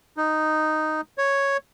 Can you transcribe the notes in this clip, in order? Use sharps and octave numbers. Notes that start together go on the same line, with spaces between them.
D#4
C#5